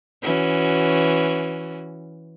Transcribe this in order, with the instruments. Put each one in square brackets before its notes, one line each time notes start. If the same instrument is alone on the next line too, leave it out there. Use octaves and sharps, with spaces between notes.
[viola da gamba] E3 C#4 F#4